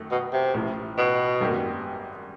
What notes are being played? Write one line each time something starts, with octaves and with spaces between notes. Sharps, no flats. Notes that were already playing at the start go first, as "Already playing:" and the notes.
Already playing: F#2 D#3 F#3 A3
B2
C3
A1 A2 F3
B2
G#1 F#2 D#3 G3 A#3